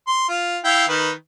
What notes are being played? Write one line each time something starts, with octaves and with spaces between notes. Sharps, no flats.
C6
F4
E4 F5 G5
D#3 B4